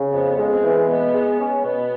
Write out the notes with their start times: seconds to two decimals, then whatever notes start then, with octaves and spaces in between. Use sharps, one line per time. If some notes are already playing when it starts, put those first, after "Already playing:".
Already playing: C#3
0.13 F2 B3
0.38 G#3
0.52 C4
0.63 E3
0.88 B2 B3
1.14 G#3
1.39 C#4
1.65 B2 B3